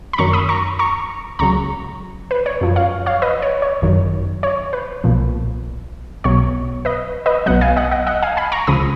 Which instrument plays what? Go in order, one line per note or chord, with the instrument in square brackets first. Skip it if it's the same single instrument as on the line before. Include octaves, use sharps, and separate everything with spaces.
[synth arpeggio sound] B5
F#2 D#3 F#3 A#5 C#6
B5 D#6
A#5 C#6
A#5 C#6
C#2 C#3 F#3 A#5 C#6
B4
C#5
F#2 F3
C#5 F5
C#5 F5
B4 D#5
C#5
C#5
G#1 F#2 D#3 F#3
C#5
B4
B1 A#2 F3
B1 B2 F#3 C#5
B4 D#5
B4 D#5
B1 B2 F#3 D#5 F#5
F5 G#5
D#5 F#5
D#5 F#5
D#5 F#5
F5 G#5
G#5 B5
A#5 C#6
C#2 C#3 F3 B5 D#6